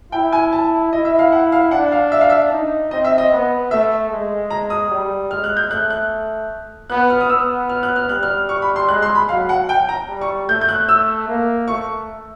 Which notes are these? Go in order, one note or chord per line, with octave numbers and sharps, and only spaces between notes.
E4 G5
G#5
A5
E4 D#5
E5
F5
F#5
F5
D4 F#5
F5
E5
F5
E5
D#4
C4 D#5
E5
D#5
B3
A3 E5
G#3
A#5
D#6
G3
G#3 F6
F#6
G6
A3 F#6
F#6
B3 F#6
F6
D#6
B3 E6
F6
F#6
F6
G3 F#6
F6
C#6
B5
C6
G#3 F#6
C6
B5
F#3 F5
F#5
G5
A#5
G3
C#6
A3 G6
G6
F#6
E6
A#3
A3 C#6